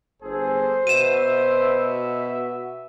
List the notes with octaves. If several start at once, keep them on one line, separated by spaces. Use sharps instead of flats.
G1 G#4 A4 C5
B2 F#4 E5 D#7 E7